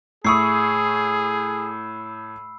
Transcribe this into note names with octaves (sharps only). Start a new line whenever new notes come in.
A2 G#4 B5 C#6 D#6 E6 C7